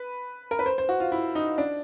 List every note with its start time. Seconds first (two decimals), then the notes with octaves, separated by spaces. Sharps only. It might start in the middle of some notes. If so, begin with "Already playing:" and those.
Already playing: B4
0.51 A#4
0.59 B4
0.66 C5
0.78 C5
0.89 F#4
1.00 F4
1.12 E4
1.35 D#4
1.58 D4